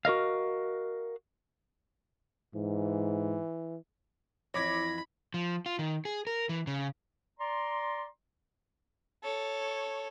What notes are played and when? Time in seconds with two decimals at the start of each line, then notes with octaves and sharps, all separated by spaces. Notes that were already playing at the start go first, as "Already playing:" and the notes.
0.05 F#4 A#4 D#5 F5
2.55 G#2 E3
4.54 F2 E3 E4 C#5 B5 D6 G#6 A#6
5.34 F3
5.66 F4
5.79 D#3
6.05 G#4
6.27 A#4
6.49 E3
6.67 C#3
7.40 D5 A#5 C6
9.23 A4 C#5